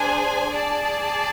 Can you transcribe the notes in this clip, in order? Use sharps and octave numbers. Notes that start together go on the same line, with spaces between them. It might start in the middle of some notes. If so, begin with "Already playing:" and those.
Already playing: D4 G#4 C5 G#5
G#4 D5 A5